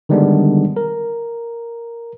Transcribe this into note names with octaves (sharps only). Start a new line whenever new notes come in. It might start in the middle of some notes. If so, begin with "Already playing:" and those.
D3 D#3 G3 G#3 B3 D4
A#4